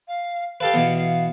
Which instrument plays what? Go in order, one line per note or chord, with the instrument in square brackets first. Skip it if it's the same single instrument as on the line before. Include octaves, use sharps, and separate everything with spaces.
[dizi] F5
[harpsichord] G4 A4 B4 [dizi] F5
[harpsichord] B2 E3 B3
[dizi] F5